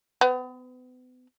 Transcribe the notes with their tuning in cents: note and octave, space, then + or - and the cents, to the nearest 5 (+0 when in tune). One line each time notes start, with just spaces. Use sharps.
B3 +35